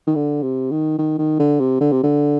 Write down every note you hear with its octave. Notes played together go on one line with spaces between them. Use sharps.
D#3
D3
C3
D#3
D#3
D#3
D3
C3
D3
C3
D3